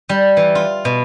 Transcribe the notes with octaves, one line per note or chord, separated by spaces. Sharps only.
G3
E3
F4
B2